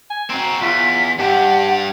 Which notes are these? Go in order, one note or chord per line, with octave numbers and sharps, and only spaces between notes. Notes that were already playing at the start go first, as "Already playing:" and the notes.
G#5
C4 F#4 A#5
E2 F4 B6
G2 D4 G4 F#5